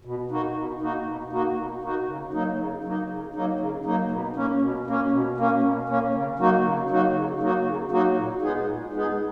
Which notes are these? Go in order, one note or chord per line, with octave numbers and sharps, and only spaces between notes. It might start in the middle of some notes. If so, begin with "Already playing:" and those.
B2
A#3 D#4 F#4
B2
A#3 D#4 F#4
B2
A#3 D#4 F#4
B2
A#3 D#4 F#4
C#3
F#3 A#3 D#4
C#3
F#3 A#3 D#4
C#3
F#3 A#3 D#4
C#3
F#3 A#3 D#4
B2
A#3 C#4
B2
A#3 C#4
B2
A#3 C#4
B2
A#3 C#4
C#3
F#3 A#3 D#4 F#4
C#3
F#3 A#3 D#4 F#4
C#3
F#3 A#3 D#4 F#4
C#3
F#3 A#3 D#4 F#4
A#2
G#3 B3 D#4 G#4
A#2
G#3 B3 D#4 G#4